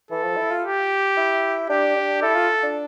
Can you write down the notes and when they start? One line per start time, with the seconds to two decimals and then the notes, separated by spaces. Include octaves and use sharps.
0.11 E3 A4
0.24 F3
0.37 E4
0.51 F4
0.63 G4
1.17 E4
1.69 D4 G4
1.96 D4
2.22 E4 A4
2.36 F4
2.63 D4